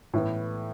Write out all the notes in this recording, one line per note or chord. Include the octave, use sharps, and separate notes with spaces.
A2 E3 B3